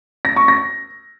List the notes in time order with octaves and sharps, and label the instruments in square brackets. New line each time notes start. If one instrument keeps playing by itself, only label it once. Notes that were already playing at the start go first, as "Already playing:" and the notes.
[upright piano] A#6
C#6
A#6